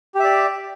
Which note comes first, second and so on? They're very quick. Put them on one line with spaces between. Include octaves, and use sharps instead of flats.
G4 E5 D5